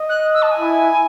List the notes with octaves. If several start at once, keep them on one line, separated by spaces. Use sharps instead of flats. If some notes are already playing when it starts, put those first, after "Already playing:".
Already playing: D#5
F#6
E6
A5
G#5
E4